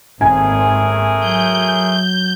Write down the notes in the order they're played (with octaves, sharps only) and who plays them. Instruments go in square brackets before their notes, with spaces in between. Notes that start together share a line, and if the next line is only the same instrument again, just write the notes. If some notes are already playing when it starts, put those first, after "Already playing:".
[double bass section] G#1 D#2 C4 [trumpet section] A3 G#4 A#4 [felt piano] G#5
[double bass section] F#3 [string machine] G6